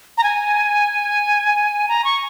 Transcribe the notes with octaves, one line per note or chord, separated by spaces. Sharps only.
A#5
G#5
A#5
C#6